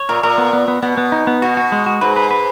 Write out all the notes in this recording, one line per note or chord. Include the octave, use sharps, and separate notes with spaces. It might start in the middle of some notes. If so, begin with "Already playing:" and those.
Already playing: C#5
A#2 A#4
A#2 A#4
B3
B3
B3
B2 B3
B3
D#4
B3
B2 F#4
F#4
G#3
F#4
G#2 B4
B4
B4